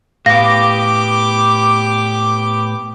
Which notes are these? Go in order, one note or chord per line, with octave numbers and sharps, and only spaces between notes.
A2 B3 G4 F5 D6 A#6